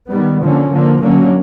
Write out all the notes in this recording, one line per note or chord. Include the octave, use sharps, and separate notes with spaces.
D#3 G3 B3
D3 F3 A#3 C#4
D3 F3 A#3
D3 F#3 A#3 C#4